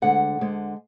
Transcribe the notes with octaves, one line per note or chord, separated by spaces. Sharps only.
D2 D3 G#3 F#5
D2 D3 G#3